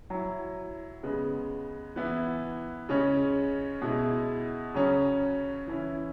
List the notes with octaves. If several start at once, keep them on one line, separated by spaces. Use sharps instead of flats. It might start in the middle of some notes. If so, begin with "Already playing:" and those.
F#3 E4
C#3 G#3 B3
E3 B3 E4
C#3 G#3 C#4
B2 G#3 E4
C#3 F#3 C#4
E3 C#4 E4